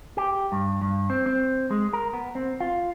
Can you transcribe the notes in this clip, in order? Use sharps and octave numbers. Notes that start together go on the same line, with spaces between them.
G4
G2
G2
C4
C4
G#3
A#4
B3
C4
F4